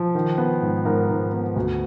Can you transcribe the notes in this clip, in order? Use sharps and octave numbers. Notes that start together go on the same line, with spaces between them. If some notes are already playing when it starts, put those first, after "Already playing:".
Already playing: F3
D#3
B3
G#2
G#2 A#4
G#2
B3
D2